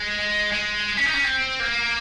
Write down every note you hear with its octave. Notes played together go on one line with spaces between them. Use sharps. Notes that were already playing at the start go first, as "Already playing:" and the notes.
Already playing: G#3
G#3
C#4
D#4
C#4
C4
A#3